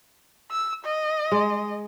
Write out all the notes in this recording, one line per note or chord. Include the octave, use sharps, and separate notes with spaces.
E6
D#5
G#3